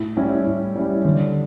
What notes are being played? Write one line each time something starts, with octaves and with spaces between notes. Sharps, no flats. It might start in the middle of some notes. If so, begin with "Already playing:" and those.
Already playing: A2
G3 C#4 E4
A2
G3 C#4 E4
D3